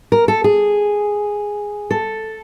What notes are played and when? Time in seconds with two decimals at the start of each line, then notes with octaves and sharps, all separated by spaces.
0.12 A#4
0.28 A4
0.44 G#4
1.91 A4